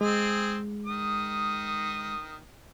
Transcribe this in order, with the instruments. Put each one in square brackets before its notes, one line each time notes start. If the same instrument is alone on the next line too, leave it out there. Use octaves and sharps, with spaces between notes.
[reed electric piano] G#3 [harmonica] C4 G#4
[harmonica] D#3 D#6